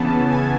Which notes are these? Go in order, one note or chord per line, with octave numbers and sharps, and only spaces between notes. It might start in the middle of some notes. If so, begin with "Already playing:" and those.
Already playing: C#3 E3 B3 A5
G#5